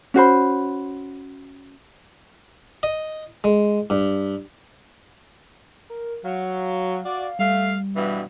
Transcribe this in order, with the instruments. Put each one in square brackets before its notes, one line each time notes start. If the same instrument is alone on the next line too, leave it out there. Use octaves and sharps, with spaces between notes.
[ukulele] C#4 F#4 C5 B5
[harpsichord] D#5
G#3
G2
[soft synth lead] A#4
[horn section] F#3 [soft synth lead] F5
[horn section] F#4 D5
[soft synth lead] G3 [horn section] A3 F5
[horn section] G2 B2 E3